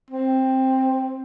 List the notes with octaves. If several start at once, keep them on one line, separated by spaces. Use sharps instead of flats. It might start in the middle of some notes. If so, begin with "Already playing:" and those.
C4